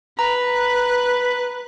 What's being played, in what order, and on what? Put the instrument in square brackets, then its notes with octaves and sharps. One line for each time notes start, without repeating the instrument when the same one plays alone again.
[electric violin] B4 [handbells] A#5